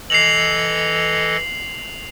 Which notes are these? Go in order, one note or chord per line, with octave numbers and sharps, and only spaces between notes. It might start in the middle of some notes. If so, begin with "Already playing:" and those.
E3 A4 D#5 C7 F7 F#7